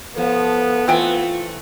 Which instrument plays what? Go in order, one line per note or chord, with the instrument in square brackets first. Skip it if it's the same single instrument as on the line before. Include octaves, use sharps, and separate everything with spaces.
[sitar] F3 [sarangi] B3 [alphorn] A4
[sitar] E3 A3 [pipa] C4 G5 G#5 [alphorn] F4